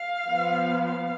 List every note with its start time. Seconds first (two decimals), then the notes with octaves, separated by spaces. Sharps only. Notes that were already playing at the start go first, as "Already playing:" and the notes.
Already playing: F5
0.27 F3 B3
0.86 F5